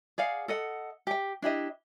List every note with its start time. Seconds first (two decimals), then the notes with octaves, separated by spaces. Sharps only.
0.18 G#4 D5 F5 F#5
0.48 A4 D#5 F#5
1.07 G4 G5
1.42 D4 E4 G4 D#5